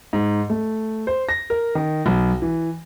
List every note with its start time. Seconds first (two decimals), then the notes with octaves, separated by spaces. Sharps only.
0.13 G#2
0.50 A3
1.07 C5
1.29 A#6
1.50 A#4
1.75 D#3
2.06 B1
2.42 E3